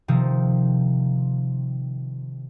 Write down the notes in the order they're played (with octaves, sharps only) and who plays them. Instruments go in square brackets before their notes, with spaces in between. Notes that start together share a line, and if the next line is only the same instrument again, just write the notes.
[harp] C3 D#3 F3